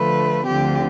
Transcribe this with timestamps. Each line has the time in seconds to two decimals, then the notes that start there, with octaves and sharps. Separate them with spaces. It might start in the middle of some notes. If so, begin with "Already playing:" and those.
Already playing: D3 F3 A3 B4
0.46 D2 D3 F3 C4 G4